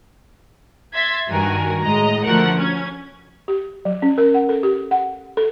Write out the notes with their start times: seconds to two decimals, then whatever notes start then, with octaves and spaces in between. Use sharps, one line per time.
0.93 E5 C6 G#6 A6 B6
1.28 G2 D#3 F#4 A#4 G#5
1.84 A2 G#3 D#5 A#5
2.25 D3 F3 A3 F#4 A#4 F#5
2.57 C#4 G#6
3.48 G4
3.85 F#3
4.02 C#4
4.18 A#4
4.34 F#5
4.49 A4
4.63 G4
4.91 F#5
5.37 A4